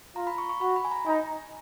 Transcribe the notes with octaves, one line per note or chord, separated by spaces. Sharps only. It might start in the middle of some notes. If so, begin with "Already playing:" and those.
F4 A#5
B5
C#6
C#6
F#4 B5
B5
G#5
A#5
D#4 G#5